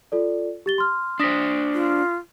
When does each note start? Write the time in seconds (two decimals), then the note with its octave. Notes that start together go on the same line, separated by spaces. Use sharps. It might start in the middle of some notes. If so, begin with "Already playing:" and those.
0.12 F4 A4 D5
0.66 G4 A6 G7
0.78 C6 F6
1.20 D4 C5 D#6 A#6 B6
1.73 F4